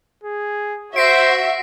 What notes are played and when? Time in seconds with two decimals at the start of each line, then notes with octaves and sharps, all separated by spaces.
0.24 G#4
0.96 F#4 C5 E5 A#6 C7 D7